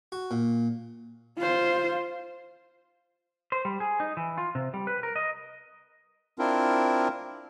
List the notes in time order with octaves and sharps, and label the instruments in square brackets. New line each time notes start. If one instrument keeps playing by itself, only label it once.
[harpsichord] F#4
A#2
[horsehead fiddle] F4 C5
[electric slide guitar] C5
G3
G#4
D#4
E3
F4
C3
G3
B4
A#4
D#5
[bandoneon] C4 D4 E4 F4 A#4